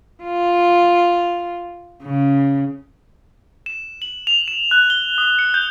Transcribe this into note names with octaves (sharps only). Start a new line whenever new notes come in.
F4
C#3
E7
F#7
F7
E7
F#6
G7
D#6
C#7
G6